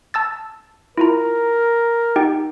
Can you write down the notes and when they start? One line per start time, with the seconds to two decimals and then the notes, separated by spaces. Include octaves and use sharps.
0.14 A5 E6 A6
0.98 E4 F4 A#4 A#5
2.16 D#4 G4 G5